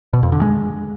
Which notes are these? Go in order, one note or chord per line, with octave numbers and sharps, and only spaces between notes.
B2
F2
D3
G#3